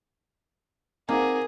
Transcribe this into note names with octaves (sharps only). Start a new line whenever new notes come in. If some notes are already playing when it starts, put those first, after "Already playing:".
A#3 C4 D#4 G#4 A#4 F#5 A#5 D6